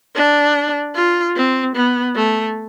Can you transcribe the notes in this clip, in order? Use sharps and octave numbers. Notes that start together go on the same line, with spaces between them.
D4
F4
C4
B3
A3